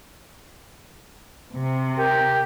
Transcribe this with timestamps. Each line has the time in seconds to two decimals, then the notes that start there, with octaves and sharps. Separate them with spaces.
1.52 C3
1.96 G4 A#4